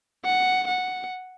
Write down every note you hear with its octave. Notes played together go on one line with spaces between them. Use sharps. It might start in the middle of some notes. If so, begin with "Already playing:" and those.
F#5
F#5